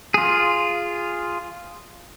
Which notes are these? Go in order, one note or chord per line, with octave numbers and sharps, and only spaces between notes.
F4 G#4